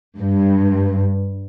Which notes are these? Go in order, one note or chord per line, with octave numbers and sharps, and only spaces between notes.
G2